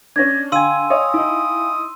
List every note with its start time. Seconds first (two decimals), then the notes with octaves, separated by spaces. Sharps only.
0.16 C#4 D4 G#6 A#6
0.52 D3 F5 G5 G#5 C6 E6 G#6 D#7
0.90 C#5 D#5 D#6
1.14 D#4 E4